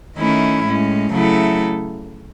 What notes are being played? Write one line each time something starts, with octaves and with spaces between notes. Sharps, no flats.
D#3 A3 C#4 E4
A2 G#3 C#4
C#3 F#3 A3 E4 A4